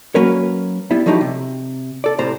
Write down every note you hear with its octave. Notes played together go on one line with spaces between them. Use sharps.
F#3 A#3 C#4 A#4 B4 C#5
G3 B3 E4
F3 F#3 A3 D#4 E4 G4
C3
A4 D5
A2 C3 C5 A#5